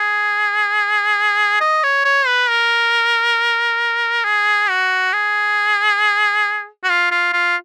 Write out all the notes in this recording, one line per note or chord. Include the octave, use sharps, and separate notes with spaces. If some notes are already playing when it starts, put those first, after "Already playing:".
Already playing: G#4
D#5
C#5
C#5
B4
A#4
G#4
F#4
G#4
F#4
F4
F4
F4